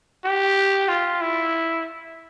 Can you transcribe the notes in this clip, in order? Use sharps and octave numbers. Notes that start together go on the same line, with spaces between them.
G4
F4
E4